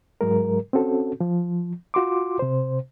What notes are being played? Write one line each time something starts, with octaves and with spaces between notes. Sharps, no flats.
G#2 F#3 G#3 A#4
C4 C#4 F#4 A4
F3
F4 F#4 C6 D6
C3 C5